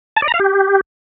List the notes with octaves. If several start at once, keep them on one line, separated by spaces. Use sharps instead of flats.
A5
D5
A#5
F5
G4